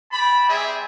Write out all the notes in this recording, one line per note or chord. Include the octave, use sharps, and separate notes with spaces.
G4 A5 B5
G3 C4 G#4 E5